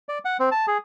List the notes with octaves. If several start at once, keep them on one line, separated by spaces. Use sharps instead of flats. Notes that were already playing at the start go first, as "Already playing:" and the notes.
D5
F#5
C4
A5
G#4